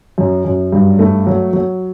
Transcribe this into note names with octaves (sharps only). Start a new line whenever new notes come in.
F#2
F#2
G2
A3
F#3
F#3